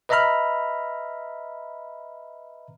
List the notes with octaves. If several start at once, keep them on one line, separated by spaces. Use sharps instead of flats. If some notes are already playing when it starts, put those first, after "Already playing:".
B4 D#5 E5 A#5 B5 F6